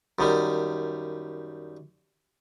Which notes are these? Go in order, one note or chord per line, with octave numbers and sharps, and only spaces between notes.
F#2 D#3 G3